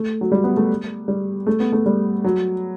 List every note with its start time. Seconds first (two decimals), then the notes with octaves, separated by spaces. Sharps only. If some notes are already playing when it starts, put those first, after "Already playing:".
Already playing: A3
0.21 F#3
0.32 G3
0.44 B3
0.57 A3
1.08 G3
1.47 A3
1.60 B3
1.73 A3
1.86 G3
2.24 F#3